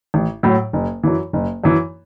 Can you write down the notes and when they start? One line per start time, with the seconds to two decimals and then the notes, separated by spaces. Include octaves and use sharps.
0.14 A1
0.43 A2 F#3
0.73 F#1
1.03 F#2 E3
1.33 F#1
1.64 F#2 E3